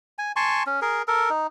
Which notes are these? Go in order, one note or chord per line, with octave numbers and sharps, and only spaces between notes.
G#5
G#5 A5 C6 C#6
C#4
G#4 A#4
A4 A#4
D#4